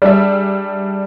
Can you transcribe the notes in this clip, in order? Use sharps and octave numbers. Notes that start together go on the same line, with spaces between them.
G3 D4 G#4 E5